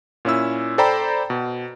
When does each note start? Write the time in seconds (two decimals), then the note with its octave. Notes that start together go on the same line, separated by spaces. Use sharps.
0.25 A#2 C#4 E4 E6
0.78 A4 C5 D5 G5 A#5 B5
1.30 B2